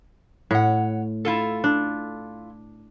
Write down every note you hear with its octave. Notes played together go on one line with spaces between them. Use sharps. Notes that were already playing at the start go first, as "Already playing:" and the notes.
A2 C#5 F#5
E4 F4 A4
D4